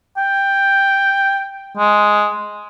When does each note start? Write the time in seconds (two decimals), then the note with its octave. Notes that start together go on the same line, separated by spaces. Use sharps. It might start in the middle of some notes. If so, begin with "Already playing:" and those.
0.17 G5
1.78 G#3